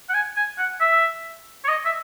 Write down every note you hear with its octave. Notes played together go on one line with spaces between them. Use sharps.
F#5
G#5
G#5
F#5
E5
C#5
D#5
E5